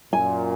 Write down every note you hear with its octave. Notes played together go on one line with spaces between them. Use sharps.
F#2 A#2 G#5